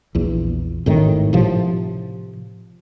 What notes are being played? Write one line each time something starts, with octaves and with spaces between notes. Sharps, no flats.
A#1 E2
G#1 A2 D#3
A2 C3 F3